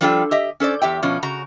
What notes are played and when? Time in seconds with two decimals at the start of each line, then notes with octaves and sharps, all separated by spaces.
0.01 F3 G3 D4 F4 A4 G5
0.31 G4 D#5 E5
0.60 C#4 A4 C5 D5
0.82 E2 G4 E5 G5
1.03 B2 F3 C#4
1.23 C#3 F#4 A#5